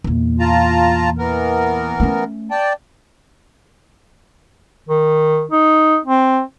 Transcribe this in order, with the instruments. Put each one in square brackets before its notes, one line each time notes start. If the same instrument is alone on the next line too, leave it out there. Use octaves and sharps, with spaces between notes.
[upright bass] E2 A#2
[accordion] F4 A5 A#5
E3 B3 A#4
[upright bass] A3 C#4
[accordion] D5 G5 A5
[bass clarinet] D#3
D#4
C4